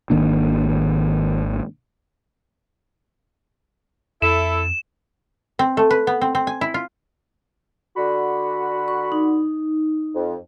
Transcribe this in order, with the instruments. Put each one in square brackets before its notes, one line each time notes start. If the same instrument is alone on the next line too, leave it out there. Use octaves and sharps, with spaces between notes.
[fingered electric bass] G#1 D#3 A#3 D4
[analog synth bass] F2 [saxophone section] E4 A4 [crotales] E7
[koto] C4
A3
B4
B3
C4
C4
G#5
E4
F4
[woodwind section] D3 F#4 B5
[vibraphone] C#6
D#4
[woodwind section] F2